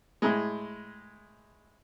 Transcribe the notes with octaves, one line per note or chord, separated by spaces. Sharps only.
A2 G#3